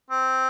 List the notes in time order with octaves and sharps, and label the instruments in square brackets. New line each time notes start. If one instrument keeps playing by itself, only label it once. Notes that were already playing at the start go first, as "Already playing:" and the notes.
[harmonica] C4